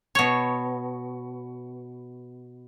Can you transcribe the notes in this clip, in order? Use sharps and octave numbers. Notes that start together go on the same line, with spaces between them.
B2 C#5